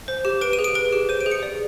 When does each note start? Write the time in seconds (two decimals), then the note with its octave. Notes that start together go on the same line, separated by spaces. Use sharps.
0.08 C5
0.25 G4
0.41 B4 D7
0.53 D#7
0.59 G#4
0.64 D7
0.75 B4 D7
0.93 G4
1.09 C5 D#7
1.21 D7
1.26 G#4
1.32 C#7
1.43 D5